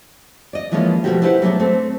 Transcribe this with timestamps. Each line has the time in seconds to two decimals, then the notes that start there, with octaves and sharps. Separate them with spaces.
0.53 D5 D#5
0.72 E3 F3 G#3 A#3 C#4 F4
1.04 B2 D#3 F3 A3 F#4 G4
1.22 E4 G4 B4 C5 D5 F#5
1.42 F#3 A3 B3 C#4 D4 G#4
1.60 A3 C4